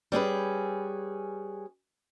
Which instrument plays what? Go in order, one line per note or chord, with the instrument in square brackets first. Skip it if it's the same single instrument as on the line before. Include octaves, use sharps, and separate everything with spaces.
[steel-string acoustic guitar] G3 C#4 G#4 B4